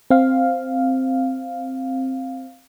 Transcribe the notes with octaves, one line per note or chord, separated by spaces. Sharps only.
C4 F5